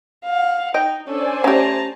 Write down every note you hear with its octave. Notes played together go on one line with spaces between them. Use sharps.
F5 F#5
D#4 D#5 G5
C#4 D4 A4 C5 D5 G#5
A3 C#4 G4 A5 A#5